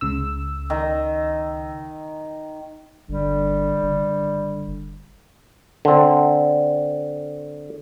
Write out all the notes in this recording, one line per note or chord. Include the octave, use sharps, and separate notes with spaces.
C#2 C#3 E6
D#3
G1 D3 G3
F#1 D3
D3 C4